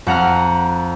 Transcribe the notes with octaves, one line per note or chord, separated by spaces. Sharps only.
F2 F#5 A#5 F6